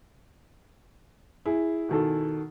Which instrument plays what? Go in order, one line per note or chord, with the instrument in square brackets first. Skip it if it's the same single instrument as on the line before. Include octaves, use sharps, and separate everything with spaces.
[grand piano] E4 G#4
[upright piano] B2 D#3 A4